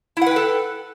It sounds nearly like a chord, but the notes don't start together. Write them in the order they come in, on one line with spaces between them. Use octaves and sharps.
E4 F#5 B4 G5 A4